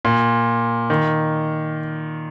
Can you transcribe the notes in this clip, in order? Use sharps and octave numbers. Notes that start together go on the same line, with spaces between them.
A#2
D#3